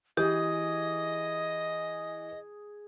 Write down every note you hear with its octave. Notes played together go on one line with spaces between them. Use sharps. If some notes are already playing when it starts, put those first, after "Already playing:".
E3 G4 G#4 D#5